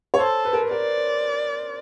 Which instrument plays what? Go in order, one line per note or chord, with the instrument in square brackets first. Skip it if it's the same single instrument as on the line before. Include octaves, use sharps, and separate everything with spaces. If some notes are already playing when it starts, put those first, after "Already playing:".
[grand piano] C#5
[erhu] A4 [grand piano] C5
[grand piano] B4
A#4
B4
[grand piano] A#4 [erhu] D5